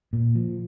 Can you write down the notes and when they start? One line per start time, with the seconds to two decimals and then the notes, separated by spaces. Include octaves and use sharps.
0.13 A#2
0.35 F3